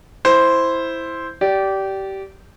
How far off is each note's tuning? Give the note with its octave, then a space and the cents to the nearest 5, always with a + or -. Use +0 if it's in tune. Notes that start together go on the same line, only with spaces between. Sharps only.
E4 +0 C5 +0
G4 -20 D5 -15